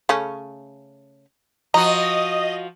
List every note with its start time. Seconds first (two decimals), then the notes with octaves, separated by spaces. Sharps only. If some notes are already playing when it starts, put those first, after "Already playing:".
0.09 C#3 A3 C#4
1.74 F3 F#4 D#5 A#5 D#6